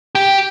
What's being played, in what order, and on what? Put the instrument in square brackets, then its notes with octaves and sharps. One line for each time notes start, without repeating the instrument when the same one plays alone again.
[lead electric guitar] G4